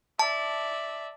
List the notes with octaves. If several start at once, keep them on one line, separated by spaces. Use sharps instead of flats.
D5 E5 A5